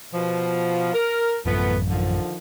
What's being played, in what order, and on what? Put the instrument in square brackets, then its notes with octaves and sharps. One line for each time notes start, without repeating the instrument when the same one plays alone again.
[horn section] B2 F3
A#4
[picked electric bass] A1 F#2 [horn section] F3 A3 B3
[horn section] D3 D#3 F3